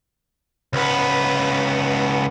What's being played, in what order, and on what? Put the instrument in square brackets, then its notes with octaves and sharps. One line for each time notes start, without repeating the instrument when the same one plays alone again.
[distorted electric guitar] C#2 B3